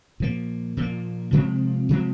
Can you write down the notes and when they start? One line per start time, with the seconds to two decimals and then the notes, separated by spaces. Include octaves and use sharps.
0.20 A#2 F3 A#3
0.77 A#2 F3 A#3
1.33 C3 F3 G#3 C4
1.89 C3 F3 G#3 C4